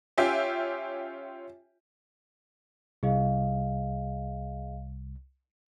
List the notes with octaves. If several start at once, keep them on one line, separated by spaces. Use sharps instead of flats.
C#4 F4 G4 E5 G5 G#5
C2 G#4 D#5 F5